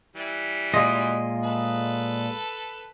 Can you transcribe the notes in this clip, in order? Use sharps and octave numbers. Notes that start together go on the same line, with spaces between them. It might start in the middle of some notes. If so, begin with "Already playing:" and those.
E3 G3
A#2 G#3 D#5
A4 B4